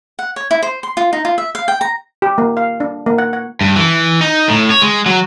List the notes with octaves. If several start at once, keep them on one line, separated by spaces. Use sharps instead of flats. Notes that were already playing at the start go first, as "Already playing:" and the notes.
F#5
C#5
E4
C5
C6
F4
D#4
F4
E5
F5
G5
A#5
G4
A#3
F5
D4
A#3
F#5
F#5
G2
E3
D#4
A2
C#5
G#3
F#3